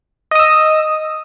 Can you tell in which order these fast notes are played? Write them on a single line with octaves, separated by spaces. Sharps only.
D#5 D#6 E6